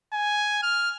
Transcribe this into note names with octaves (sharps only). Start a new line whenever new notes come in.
G#5
F6